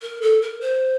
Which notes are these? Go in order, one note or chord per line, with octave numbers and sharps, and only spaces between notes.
A#4
A4
A#4
C5